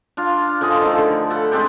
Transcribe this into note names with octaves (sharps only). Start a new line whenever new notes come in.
D4 F4
D3 F3 G#4 D#5
D#3 F3 A3
D3
A4 F#5 B5
G#3 C4 D4 G4